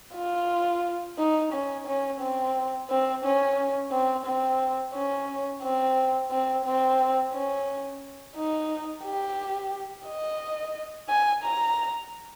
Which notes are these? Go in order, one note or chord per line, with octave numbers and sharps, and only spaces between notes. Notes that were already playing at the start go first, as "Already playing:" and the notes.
F4
D#4
C#4
C#4
C4
C4
C#4
C4
C4
C#4
C4
C4
C4
C#4
D#4
G4
D#5
G#5
A#5